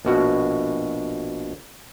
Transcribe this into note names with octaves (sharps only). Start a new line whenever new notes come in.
A#1 B2 F#4